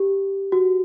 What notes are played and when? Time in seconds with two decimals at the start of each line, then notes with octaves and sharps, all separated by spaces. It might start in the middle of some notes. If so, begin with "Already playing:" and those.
Already playing: G4
0.52 F#4